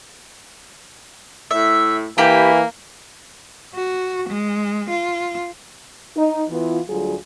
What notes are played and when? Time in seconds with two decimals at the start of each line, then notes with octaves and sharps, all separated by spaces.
1.51 A2 E5
2.18 E3 A#3 G4 B5
3.74 F#4
4.28 G#3
4.89 F4
6.16 D#4
6.50 E3 B3 E4 F4
6.88 D2 F#3 G3 F4 G#4